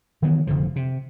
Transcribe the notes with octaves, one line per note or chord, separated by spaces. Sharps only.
D#3 E3 F#3 B3
F1 D3 F3
C3